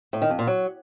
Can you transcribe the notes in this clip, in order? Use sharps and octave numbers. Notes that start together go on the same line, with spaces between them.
A2
D#3
F2
A#2
F#3